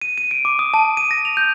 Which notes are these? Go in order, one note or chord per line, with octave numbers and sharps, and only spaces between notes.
D#7
D#7
D7
D6
D#6
A5
D#7
A#6
F7
G6